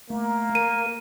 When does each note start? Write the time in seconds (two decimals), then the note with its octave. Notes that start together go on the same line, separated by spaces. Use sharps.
0.10 A3 A#3
0.55 A#4 D#7